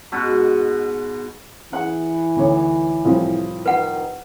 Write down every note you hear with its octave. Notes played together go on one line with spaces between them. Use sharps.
G#2 B2 F#4
E3 G#4 B4 F#5
D2 D#4 C#5
C2 A2 F3
D#3 B4 F#5